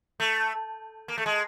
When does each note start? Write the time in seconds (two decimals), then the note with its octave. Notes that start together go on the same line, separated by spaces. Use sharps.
0.20 A3
1.08 A#3
1.18 A3
1.26 G#3